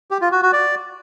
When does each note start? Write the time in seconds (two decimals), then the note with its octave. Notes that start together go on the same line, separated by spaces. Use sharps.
0.11 G4
0.21 F4
0.32 F#4
0.42 F#4
0.53 D5